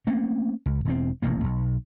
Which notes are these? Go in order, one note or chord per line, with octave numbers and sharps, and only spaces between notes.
A3 A#3 C4 C#4
C#2
E1 E2 C4
E1 A1 C3 A#3
B1